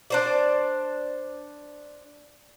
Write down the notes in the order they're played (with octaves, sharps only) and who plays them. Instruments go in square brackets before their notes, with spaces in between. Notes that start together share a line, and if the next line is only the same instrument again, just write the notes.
[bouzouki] D4 C5 D5